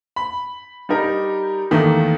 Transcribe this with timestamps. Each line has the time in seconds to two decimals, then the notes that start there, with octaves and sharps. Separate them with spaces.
0.16 B5
0.89 G3 D#4 G4 A#4
1.71 E2 D#3 A3 A#3